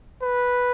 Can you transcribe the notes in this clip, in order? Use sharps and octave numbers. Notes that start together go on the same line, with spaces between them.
B4